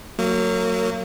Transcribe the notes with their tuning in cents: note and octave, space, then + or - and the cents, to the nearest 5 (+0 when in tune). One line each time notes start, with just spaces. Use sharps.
F#3 +0 A#3 -30